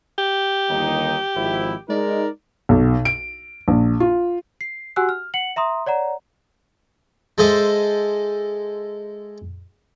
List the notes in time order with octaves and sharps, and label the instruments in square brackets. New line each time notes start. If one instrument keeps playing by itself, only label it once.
[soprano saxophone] G4
[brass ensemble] G1 D#2 D#4
G#1 F3 E4
[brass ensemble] G#3 D#4 A#4 [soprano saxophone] D5
[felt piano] B1
D7
A#1
F4
[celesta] C7
F#4 G4 F#5 G#5 E6 F#6
F6
F#5 C#7 F#7
E5 A#5 C6 D#6
C#5 D5 F#5 A#5
[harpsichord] G#3 A4 C5 D#5 E5